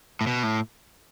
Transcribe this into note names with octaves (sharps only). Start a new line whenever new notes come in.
A2
B2
A2